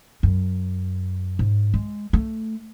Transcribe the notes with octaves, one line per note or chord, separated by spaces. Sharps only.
F#2
G#2
G#3
A3